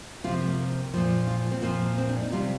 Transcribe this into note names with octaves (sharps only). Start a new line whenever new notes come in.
C3 F3 F4
A#3
A#2 F3
F4
C4
A#2 F3 A#3
C4
D4
D#4
C3 G3 F4